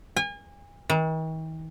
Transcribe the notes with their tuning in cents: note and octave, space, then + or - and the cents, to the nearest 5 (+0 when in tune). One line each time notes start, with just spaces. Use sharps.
G#5 -35
D#3 +45